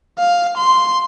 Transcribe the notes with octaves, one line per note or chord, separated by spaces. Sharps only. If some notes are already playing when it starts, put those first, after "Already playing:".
F5
C6